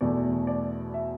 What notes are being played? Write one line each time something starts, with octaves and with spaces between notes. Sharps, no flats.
E2 B2 A3 D5
D5
E5